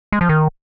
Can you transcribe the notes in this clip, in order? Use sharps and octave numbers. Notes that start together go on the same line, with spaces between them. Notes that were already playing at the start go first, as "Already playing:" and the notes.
G#3
F3
D#3